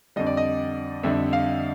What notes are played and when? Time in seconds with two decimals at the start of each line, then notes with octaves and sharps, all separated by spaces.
0.16 F2 D3 G3 D#5
0.27 D5
0.37 D#5
1.03 F2 D3 G3 E5
1.33 F5